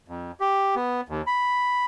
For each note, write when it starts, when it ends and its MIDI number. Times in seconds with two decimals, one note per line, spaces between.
0.08 0.31 41
0.40 0.75 67
0.76 1.01 59
1.09 1.22 39
1.27 1.86 83